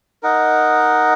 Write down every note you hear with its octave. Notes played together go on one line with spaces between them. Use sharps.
D#4 A#4 D#5 F#5